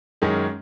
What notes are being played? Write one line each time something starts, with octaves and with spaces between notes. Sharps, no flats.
F#2 D#3 G#3 C#4